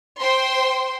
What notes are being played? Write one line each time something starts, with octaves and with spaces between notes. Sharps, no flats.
C5 G5 C6